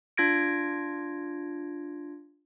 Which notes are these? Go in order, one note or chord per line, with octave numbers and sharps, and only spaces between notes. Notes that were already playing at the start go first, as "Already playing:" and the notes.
D4 F4 G#6 A#6 D7